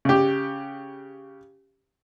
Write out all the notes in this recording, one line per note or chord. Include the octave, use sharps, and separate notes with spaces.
C#3 G4